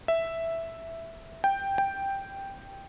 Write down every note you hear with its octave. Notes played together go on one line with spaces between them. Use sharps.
E5
G5
G5